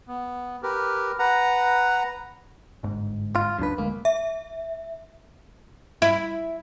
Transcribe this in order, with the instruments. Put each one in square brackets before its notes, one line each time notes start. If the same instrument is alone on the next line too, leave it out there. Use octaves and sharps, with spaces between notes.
[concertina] B3
G4 A#4 B4
B4 F#5 A#5
[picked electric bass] G1 G#2
[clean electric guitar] F4
[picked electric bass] C#2 D4 [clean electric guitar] F#2 B4
[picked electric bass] F1 D2 G#3 [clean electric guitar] A#3
[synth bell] E5
[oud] E4